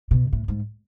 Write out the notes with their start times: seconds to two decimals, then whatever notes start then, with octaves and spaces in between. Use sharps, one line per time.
0.11 B2
0.33 A2
0.48 G#2